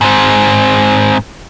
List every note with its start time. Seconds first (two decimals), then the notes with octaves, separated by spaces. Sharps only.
0.01 G#2 C4